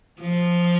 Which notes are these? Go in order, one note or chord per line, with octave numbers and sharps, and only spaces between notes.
F3